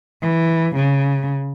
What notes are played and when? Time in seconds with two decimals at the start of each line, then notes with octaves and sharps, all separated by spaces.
0.22 E3
0.75 C#3